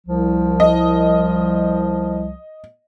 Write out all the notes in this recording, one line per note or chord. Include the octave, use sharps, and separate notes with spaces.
C2 F3
D#5